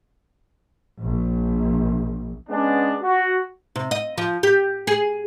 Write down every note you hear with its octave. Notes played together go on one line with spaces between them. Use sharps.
A#1
G#3 B3 C#4 D4
F#4
C3
D#5
F3
G4
G#4